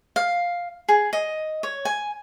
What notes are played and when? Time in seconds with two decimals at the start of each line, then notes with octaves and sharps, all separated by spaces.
0.16 F5
0.89 G#4
1.13 D#5
1.63 C#5
1.85 G#5